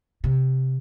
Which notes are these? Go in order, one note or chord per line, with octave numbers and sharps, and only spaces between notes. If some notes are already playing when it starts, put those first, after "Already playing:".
C3